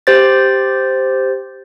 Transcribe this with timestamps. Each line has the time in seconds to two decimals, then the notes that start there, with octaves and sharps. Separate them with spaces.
0.07 G4 C5 A6